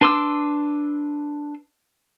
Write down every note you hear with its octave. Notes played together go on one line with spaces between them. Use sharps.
D4 B4 C6 D6 E6